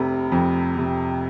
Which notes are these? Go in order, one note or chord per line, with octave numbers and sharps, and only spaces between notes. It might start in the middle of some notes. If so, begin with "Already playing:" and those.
Already playing: F1 C3 A#5 B5
F2
C3